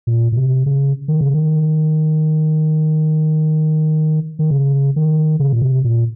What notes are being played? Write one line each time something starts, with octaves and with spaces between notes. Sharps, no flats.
A#2
A#2
C3
C#3
D#3
C#3
D#3
D#3
C#3
D#3
C#3
A#2
C3
A#2